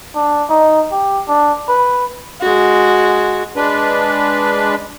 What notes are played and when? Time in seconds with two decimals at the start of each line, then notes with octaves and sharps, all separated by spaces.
0.15 D4
0.50 D#4
0.92 G4
1.28 D4
1.68 B4
2.41 G#3 F#4
3.56 G#3 D4 B4